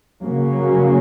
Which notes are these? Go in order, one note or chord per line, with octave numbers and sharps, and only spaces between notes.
C#3 F#3 A#3 C#4